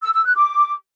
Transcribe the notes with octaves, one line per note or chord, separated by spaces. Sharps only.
E6
E6
F#6
D6